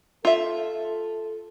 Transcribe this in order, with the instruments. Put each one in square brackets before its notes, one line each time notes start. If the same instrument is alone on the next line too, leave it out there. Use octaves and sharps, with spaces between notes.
[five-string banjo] F4 E5 [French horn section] A4